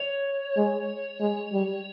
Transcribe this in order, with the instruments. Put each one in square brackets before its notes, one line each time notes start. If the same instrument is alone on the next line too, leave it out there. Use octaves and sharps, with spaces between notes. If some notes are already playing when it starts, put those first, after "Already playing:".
Already playing: [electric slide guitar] C#5
[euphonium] G#3
G#3
G3